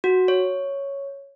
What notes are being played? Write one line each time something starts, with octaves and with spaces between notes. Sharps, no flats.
F#4
C#5